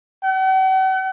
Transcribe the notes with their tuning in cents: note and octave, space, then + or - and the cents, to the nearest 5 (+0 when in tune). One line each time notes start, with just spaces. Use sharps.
F#5 +45